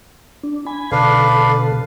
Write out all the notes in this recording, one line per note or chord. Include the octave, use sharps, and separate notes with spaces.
D4
G#5 B5
B2 D3 D4 A4 B4 F5